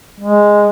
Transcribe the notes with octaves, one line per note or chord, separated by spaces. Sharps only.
G#3